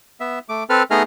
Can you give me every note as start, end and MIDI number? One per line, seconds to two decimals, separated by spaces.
0.20 0.39 59
0.20 0.39 76
0.49 0.64 57
0.49 0.64 86
0.70 0.83 60
0.70 0.83 69
0.70 0.83 71
0.70 0.83 89
0.91 1.03 57
0.91 1.03 59
0.91 1.03 63
0.91 1.03 68
0.91 1.03 75
0.91 1.03 89